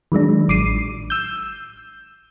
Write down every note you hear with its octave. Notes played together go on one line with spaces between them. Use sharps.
D#3 F#3 G#3 D4
A1 D6 C7 D#7
E6 G6